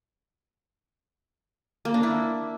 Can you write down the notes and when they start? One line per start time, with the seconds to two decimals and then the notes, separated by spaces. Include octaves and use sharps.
1.85 A#3
1.94 D4
2.03 E4